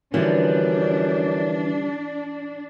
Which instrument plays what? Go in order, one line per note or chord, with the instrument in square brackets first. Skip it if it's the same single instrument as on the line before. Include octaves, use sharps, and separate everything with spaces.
[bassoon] F#2 [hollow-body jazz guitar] D3 F3 G3 [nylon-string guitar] E3 [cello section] D4